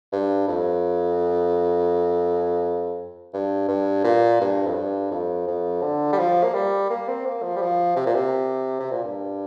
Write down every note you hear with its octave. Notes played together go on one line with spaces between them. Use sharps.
G2
F2
G2
G2
A#2
G2
F2
G2
F2
F2
D3
G3
F3
A#3
G3
A#3
C4
A#3
F3
G3
F3
C3
A#2
C3
C3
A#2
G2